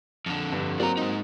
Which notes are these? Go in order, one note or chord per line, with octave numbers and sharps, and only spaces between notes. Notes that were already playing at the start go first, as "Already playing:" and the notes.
F2 D3
G2
F#3 A#3 C4 D5 A#5
G#3 D#4